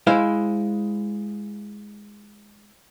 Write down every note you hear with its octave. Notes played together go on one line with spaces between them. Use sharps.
G#3 E4 C5 F5